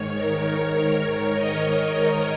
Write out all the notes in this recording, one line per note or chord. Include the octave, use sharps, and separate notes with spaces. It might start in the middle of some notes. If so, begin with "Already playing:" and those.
Already playing: G#2 D#3 C#5
A#4
C#5
A#4
C#5
D#5